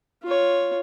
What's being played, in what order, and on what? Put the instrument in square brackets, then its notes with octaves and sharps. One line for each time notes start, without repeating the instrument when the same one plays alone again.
[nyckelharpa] F4 C#5